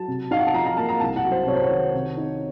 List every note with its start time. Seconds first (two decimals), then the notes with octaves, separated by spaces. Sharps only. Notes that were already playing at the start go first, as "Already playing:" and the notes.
Already playing: F#3 A5
0.08 C3
0.31 D#4 F5
0.39 F#5
0.46 A5
0.54 F3 A#5
0.66 A#5
0.77 A#3 A5
0.89 A#5
1.00 C2 A5
1.16 F#5
1.23 F#3
1.32 C5
1.46 C3 C#5
1.55 C5
1.63 C#5
1.71 D#3
1.94 C3
2.17 D#4